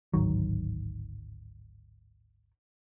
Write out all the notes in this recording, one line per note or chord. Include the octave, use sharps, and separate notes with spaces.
D1 G#1 D#3 F#3